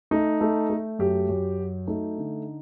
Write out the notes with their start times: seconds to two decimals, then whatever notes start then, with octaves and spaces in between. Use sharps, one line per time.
0.11 A3 D#4
0.41 A3
0.70 A3
0.99 F#2 G4
1.29 F#2
1.59 F#3
1.87 A3 D#4
2.18 D3